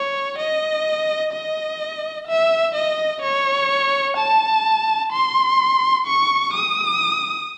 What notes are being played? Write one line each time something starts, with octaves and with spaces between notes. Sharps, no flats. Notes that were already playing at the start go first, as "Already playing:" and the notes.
Already playing: C#5
D#5
D#5
E5
D#5
C#5
A5
C6
C#6
D#6